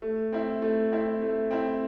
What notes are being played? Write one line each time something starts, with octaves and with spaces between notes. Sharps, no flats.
A3
C4 E4
A3
C4 E4
A3
C4 E4